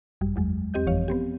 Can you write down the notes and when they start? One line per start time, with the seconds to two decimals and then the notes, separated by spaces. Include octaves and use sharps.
0.21 G#1 F#2 G3
0.36 E2 F#3 G#3
0.74 E2 C4 G4 D#5 G6
0.86 G1 F2 E3 F3 C#5 F5
1.08 B3 C4 G4